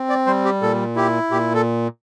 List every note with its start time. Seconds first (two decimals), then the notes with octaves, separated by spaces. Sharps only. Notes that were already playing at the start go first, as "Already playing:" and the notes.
Already playing: C4
0.09 D5
0.27 G3 C5
0.45 G4
0.62 A#2 A4
0.96 E4 G4
1.31 A#2 G4
1.55 A4